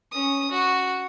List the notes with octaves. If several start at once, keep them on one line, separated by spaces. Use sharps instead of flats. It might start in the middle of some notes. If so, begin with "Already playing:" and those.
C#4 D#6
F#4